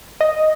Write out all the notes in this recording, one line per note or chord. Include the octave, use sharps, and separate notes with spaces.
D#5